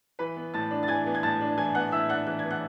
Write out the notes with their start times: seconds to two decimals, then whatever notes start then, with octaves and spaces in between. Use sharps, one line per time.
0.19 E3 B4 B5
0.36 B3
0.54 A2 A5 A6
0.71 D4
0.83 A6
0.88 E3 G#5 G#6
1.06 B3
1.15 G#6
1.23 A2 A5 A6
1.41 D4
1.58 E3 G#5 G#6
1.75 B3 F#5 F#6
1.92 A2 E5 E6
2.09 D4 F#5 F#6
2.27 E3 F#6
2.39 G#6
2.45 B3
2.50 F#5 F#6